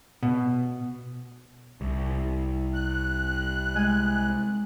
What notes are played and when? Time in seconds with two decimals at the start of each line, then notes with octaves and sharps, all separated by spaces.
0.23 B2
1.81 C2
2.74 F#6
3.75 G#3 G#5 F6